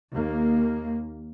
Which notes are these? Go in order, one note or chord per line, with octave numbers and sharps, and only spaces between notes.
D#2 A#3